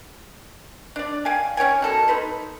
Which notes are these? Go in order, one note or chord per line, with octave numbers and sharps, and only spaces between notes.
D4 D5
C#5 F5 G5 G#5
C#4 C#5 G5 G#5
B2 A4 A#4
D#4 A4 B4 C6